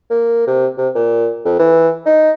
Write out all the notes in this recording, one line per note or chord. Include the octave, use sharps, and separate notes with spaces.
A#3
C3
C3
A#2
F2
E3
D#4